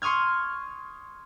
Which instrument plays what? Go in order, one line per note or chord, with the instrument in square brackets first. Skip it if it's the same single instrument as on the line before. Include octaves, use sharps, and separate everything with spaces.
[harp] C6 C#6 D#6 F6 G#6